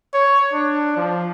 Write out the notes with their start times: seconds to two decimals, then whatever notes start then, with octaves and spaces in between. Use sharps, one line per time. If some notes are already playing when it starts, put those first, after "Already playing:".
0.14 C#5
0.53 D4
0.97 F3